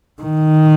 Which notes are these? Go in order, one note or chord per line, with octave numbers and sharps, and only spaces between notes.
D#3